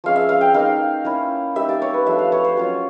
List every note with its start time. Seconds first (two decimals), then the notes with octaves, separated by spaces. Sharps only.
0.04 F3 G#3 C#4 F5
0.16 E5
0.29 F5
0.41 G5
0.54 A#3 D#4 F5
1.05 A#3 C#4 E4
1.55 G3 A#3 D#4 E5
1.69 D5
1.82 C#5
1.94 B4
2.06 F3 A3 D4 E5
2.19 F5
2.32 C#5
2.44 C5
2.57 F#3 A#3 C#4 F4 C#5